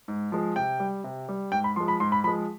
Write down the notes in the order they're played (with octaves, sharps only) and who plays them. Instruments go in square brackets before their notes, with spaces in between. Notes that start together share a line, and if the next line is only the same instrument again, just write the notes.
[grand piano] G#2
F3 G#3
C3 G5
G3
C3
G3
G#2 G5
B5
F3 G#3 C6
B5
G#2 C6
B5
F3 B5
G#3